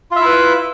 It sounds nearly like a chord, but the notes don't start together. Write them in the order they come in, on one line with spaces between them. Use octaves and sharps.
F4 E5 E4 B4